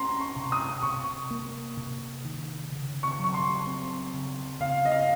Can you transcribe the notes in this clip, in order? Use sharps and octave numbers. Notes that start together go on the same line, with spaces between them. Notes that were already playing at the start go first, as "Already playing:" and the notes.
Already playing: C#4 A#5 C6
C#6
C3
D#6
C3 C#6
A#3
C3
D#3
C#3
C#6
F#3 C#6
C6
C4
C#3
C#3 F5
D#5
F5